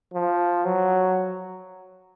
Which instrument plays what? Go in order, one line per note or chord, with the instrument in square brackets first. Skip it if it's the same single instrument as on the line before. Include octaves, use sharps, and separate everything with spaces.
[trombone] F3
F#3